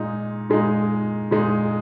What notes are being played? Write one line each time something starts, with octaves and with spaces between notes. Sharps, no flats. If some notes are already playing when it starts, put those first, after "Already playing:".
Already playing: A#2 G#3 D#4
A#2 G#3 D#4
A#2 G#3 D#4